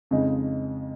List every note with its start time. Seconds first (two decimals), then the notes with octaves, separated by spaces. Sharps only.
0.11 F2 C#3 G#3 D#4 G#4